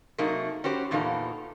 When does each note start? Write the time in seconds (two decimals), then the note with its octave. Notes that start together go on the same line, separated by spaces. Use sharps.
0.18 C3 F#3 A3 A#3 D#4 G#4
0.64 C#4 F#4 G4 C5
0.91 E2 A#2 E3 D#4 A4 F5